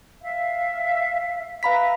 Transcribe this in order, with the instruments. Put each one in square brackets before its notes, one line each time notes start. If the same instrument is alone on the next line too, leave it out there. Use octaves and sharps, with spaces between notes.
[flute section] E5 F5
[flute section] B4 E5 A#5 [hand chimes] F5 B5 B6